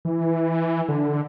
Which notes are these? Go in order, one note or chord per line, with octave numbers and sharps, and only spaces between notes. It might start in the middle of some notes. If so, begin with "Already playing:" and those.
E3
D3